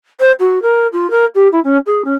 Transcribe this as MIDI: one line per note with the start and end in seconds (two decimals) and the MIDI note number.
0.20 0.31 72
0.39 0.61 66
0.62 0.87 70
0.92 1.10 65
1.10 1.25 70
1.35 1.48 67
1.52 1.60 64
1.64 1.77 61
1.86 2.02 68
2.04 2.13 61